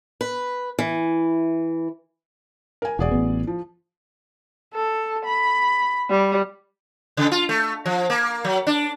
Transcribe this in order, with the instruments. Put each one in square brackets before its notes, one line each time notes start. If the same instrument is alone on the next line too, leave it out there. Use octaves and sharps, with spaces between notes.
[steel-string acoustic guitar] B4
E3
[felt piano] A#4 G#5
[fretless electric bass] E1 [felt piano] F#4 G#4 D5
[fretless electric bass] A1 B3
[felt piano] F3
[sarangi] A4
B5
G3
[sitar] C#3
F4
A3
F3
A#3
F#3
D4